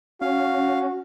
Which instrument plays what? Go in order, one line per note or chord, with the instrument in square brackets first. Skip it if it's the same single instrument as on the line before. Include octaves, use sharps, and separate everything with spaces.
[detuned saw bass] C#4 [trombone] F#4 [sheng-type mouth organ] F5